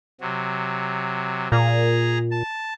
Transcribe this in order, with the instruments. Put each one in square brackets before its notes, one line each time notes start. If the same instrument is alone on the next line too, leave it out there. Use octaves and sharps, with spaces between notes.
[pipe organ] C3 F#3
[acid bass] A#2 [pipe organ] G#4 A#5
[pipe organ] A5